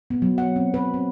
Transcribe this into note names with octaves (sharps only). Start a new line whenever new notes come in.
B3
F#3
F#5
C4
B4
C4